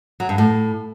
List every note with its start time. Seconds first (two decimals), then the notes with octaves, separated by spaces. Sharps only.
0.20 F#3
0.29 G2
0.38 A2